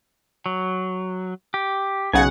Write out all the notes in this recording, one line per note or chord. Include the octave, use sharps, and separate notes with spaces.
F#3
G4
B1 C#3 F#5 G#5